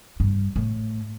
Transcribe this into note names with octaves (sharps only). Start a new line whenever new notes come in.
G2
A2